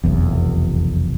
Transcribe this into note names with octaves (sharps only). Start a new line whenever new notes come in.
F1 B1 E2